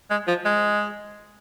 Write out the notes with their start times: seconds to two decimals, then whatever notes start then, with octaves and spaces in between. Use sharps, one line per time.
0.11 G#3
0.28 F3
0.45 G#3